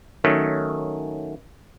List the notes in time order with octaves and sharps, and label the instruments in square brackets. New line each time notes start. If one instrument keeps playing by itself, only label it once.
[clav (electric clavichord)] D#3 F#3 A3 C#4